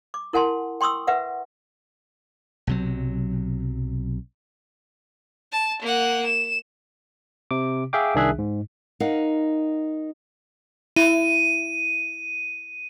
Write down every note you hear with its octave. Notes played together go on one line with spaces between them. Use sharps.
D6
E4 A#4 F#5 G#5 A5 C6
G5 C6 C#6 D#6 E6
B4 E5 F#5
B1 C3 F#3
A5
A#3 F#5
E7
C3 D6
G#4 E5 F5 G5 D6
C2 D#3 D4 G#4 E5 F#6
G#2
D#4 A#4 F5 F#5
E4 D#7